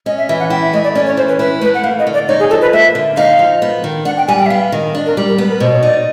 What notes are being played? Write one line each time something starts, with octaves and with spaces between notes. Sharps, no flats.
C#4 D#5
E5
E3 E5
F#5
E4 G5
E5
A3 D#5
D5
C#4 D5
C#5
E3 C5
B4
E4 B4
A3 B4
F#5
A#3 F5
D#5
D3
D5
D#4 C#5
G#4
F3 A4
B4
A#3 E5
D3
D#4 F5
F3
B3
D#3
D4 F#5
G5
G3 G#5
G5
E5
B3 F5
D#3
D4
A#4
G3
A#4
B3 B4
A#4
B2 C5
C#5
D#4 D5